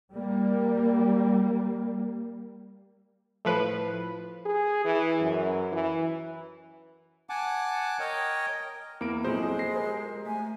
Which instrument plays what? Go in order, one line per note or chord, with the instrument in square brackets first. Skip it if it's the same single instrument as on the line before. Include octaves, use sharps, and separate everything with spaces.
[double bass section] G3 A#3
[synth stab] A2 F3 B4
[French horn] G#4
E3
F#2
E3
[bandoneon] F#5 G#5 A5 D6
A#4 C#5 D#5 G5
[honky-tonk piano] E2 [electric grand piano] A#3 D7 [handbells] E4
[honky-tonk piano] A#2 F3 C4 [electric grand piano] F#3 C5 [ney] G#3 [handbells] G#4 A4
[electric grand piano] A#6 C7
[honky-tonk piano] G4 A#4 C5
[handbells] A3 [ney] G#5